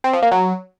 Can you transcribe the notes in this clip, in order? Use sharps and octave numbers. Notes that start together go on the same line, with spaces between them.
C4
F3
A#3
F#3